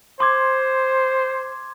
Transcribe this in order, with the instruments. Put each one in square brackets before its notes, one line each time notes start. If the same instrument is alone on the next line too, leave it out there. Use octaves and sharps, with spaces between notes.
[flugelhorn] C5 [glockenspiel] C6 D6 G#6